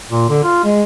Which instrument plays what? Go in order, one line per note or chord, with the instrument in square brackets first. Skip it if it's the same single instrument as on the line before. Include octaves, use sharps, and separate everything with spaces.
[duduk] A#2
D3
F4
G#3